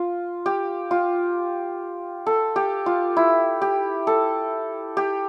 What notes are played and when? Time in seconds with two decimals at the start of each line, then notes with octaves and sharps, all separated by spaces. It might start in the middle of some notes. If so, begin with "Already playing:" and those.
Already playing: F4
0.46 G4
0.91 F4
2.26 A4
2.56 G4
2.86 F4
3.17 E4
3.62 G4
4.07 A4
4.97 G4